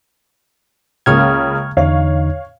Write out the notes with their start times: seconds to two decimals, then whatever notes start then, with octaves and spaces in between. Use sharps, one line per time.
1.06 C#2 C#3 A#3 C#6 F6 G#6
1.77 E2 D3 D#4 C#5 F5